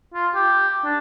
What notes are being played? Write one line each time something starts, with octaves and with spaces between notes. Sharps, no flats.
F4
G4
D4